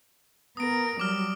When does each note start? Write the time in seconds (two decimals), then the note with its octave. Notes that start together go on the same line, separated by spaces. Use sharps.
0.57 B3 A#4 D#6 D7
1.00 F#3 G3 D6 F6